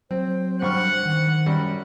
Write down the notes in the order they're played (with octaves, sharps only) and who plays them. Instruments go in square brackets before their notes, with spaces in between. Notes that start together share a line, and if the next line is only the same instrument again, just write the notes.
[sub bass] F#3 [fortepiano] C4 [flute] C5
[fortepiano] G2 C#6 F6 [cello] F#5
[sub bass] D#3
[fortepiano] F#2 G3